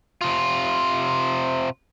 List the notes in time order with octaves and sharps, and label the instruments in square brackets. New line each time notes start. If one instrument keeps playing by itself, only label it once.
[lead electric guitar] C3 F4